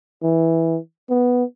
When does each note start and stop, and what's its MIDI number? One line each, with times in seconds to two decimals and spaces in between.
0.23 0.78 52
1.10 1.44 59